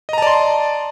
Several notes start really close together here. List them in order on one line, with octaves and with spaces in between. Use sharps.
D#5 A#5 A5 D5 C6